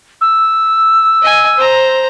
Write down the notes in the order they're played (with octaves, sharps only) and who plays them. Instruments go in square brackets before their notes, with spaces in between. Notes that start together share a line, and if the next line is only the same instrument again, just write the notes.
[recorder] E6
[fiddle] D#5 G#5
C5 A#5